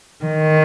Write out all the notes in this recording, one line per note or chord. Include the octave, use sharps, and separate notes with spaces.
D#3